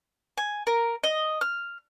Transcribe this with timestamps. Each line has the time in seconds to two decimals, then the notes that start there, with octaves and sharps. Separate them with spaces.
0.38 G#5
0.67 A#4
1.04 D#5
1.41 F6